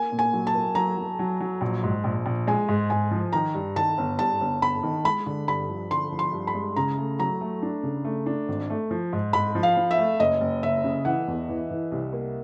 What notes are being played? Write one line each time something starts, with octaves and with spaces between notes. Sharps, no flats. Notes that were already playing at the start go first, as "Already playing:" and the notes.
Already playing: A#3 G#5
A#2
G#5
F#3
A5
A#3
F#3 A#5
F#3
F#3
F#3
A#1
G#2
A#1
A#1
G#3 G#5
G#2
G#2 G#5
F3
D#3 A#5
G2
D#3 A5
G1
G2 A5
G1
G1 B5
D#3
G#3 B5
D3
G2 B5
F3
D3 C6
F3
C6
G2
B5
G#3
C#3 A#5
A3
F#3 A#5
A3
D4
C#3
A3
D4
G#1
A3
F3
G#2
G#2 B5
F3
F5
F3
E5
A3
F#1 D#5
F#1
F#1 E5
C#3
E3 F#5
E2
E3
E3
C2
A#3